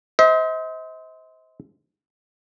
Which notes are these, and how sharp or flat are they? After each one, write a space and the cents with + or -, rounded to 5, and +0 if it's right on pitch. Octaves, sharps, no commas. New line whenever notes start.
C5 -15 D#5 +45